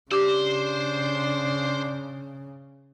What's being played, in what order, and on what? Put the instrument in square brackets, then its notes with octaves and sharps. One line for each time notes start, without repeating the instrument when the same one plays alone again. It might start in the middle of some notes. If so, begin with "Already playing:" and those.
[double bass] C#3 [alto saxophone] D4 [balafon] G4 D6 [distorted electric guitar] C5